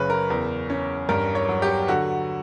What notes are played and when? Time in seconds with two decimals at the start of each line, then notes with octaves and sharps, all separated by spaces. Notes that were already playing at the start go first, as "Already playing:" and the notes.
Already playing: F#1 C#3 B4 C#5
0.10 A#4
0.30 E2
0.70 C#4
1.09 G2 A#4
1.35 C#5
1.49 F#3
1.62 G4
1.88 D3 F#4